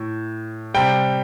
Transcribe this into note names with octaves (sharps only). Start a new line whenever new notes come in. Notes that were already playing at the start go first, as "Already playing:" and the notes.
Already playing: A2
C3 G3 G5